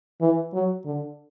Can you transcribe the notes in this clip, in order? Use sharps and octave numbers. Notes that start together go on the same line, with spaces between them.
E3
F#3
D3